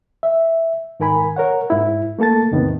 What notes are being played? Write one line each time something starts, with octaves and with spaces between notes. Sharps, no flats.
E5
G#2 D#3 A#4 G#5 B5
A#4 C#5 F#5
G#2 E4
A3 A#3 A4 A5 A6
E2 A2 C3 D#3 B3 C4